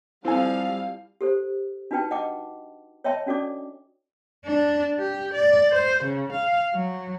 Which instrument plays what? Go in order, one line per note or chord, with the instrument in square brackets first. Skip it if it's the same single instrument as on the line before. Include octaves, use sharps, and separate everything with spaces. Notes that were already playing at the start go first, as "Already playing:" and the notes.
[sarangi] F3 [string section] G3 F5 [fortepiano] C4 A4 G#5 [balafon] E4
[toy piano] G4 A4 C5
D4 D#4 F#4 B4 G5 A5
D#5 F#5 G5 A5 D6
C#5 D#5 E5 G5 A5 C6
C#4 D4 F#4 A4 D5 D6
[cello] D4
G4
D5
C5
C#3
F5
F#3